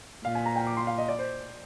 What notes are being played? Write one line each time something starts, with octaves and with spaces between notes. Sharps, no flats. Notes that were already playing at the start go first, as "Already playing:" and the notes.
A#2 F5
G#5
A#5
G5
D6
C6
F5
D#5
D5
C5